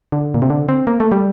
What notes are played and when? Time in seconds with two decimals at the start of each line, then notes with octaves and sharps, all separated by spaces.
0.12 D3
0.34 A#2
0.42 C3
0.50 D3
0.69 C4
0.87 A#3
1.00 A3
1.12 G3